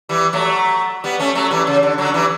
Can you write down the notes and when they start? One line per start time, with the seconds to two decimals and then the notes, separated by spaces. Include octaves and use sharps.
0.09 E3 G3
0.33 F#3 A3
1.04 G3 B3
1.20 A3 C#4
1.35 F#3 A3
1.51 E3 G3
1.67 C#3
1.83 D3
1.98 D3 F#3
2.14 E3 G3